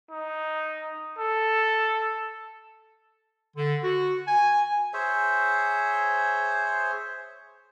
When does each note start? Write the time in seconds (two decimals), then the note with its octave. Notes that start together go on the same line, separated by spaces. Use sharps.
0.11 D#4
1.18 A4
3.56 D3
3.84 F#4
4.27 G#5
4.93 G#4 C5 C#5 E5